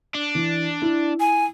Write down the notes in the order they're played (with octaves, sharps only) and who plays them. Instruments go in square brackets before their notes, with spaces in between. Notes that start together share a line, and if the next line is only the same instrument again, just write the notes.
[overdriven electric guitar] D4
[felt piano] E3
E4
[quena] G#5